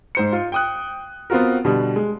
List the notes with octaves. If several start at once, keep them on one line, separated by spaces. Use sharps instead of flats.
G#2 C5 C#7
F4
G5 D#6 F#6
B3 C4 F4 F#4 A#4
B2 D3 G3
G#3